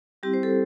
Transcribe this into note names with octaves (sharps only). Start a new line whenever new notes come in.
G3 C4 E4 G4
C5
A4